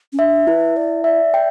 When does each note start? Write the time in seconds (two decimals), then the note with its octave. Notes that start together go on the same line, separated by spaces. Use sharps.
0.13 C#4
0.19 D4 E5
0.47 E4 B4
0.77 D5 E5
1.04 D5 E5
1.34 G5